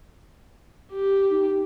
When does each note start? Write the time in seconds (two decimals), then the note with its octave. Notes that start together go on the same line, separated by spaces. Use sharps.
0.93 G4
1.30 D#4